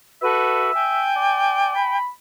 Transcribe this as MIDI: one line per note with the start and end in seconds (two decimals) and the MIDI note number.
0.22 0.71 66
0.22 0.71 69
0.22 0.71 71
0.22 1.07 76
0.74 1.97 79
0.74 1.97 80
1.16 1.72 74
1.75 2.06 83